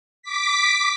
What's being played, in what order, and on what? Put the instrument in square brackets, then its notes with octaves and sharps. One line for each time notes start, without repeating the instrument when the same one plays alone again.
[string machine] D6 B6